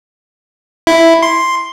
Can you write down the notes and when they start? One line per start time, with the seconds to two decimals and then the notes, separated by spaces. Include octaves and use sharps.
0.87 E4
1.23 C6